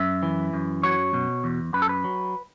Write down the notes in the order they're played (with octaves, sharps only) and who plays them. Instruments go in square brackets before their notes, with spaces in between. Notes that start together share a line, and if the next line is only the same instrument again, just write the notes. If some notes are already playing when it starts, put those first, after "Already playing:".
Already playing: [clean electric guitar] F#2 E5
E3
F#2
F#3 C#5
B2
E2
F#2 B4
A4
B4
F#3